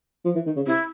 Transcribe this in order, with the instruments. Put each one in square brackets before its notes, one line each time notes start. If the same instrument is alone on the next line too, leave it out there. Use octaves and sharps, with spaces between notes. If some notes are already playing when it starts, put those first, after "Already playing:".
[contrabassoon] F3
E3
D#3
C#3
[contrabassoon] C3 [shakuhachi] E4